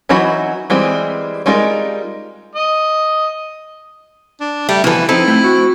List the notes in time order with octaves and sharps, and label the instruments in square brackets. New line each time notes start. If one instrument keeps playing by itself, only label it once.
[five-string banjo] E3 F#3 D#4 F#4 B5
E3 G3 G#3 C4
G3 G#3 D#4 F4 A#4
[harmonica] D#5
[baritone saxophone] D4
[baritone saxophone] G3 [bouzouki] A3
[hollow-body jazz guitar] B2 A4 [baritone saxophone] E3 [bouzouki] F3 B4
[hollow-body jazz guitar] F3 D#4 A4 [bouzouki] C4 [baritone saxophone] E4
[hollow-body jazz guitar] A3 G5
F#4